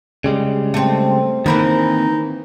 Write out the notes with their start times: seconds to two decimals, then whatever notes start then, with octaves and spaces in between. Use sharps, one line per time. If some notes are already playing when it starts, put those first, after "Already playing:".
0.24 C#3 G3 G#3
0.74 A3 C4
1.46 D#3 E3 A#3 C4 D#4 A#4 B5